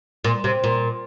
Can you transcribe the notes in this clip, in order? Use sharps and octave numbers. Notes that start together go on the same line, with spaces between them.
A#2
C3
A#2